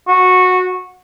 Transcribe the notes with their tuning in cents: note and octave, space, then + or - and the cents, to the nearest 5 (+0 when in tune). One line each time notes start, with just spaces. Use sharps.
F#4 -15